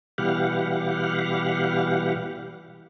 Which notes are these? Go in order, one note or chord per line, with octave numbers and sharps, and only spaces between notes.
B2 E3 G3 G4 F5 F#5